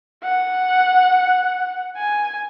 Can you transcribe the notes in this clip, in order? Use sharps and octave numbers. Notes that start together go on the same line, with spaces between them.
F#5
G#5